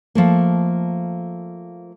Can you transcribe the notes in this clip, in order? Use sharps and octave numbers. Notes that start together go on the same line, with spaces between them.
F3 A3 A#3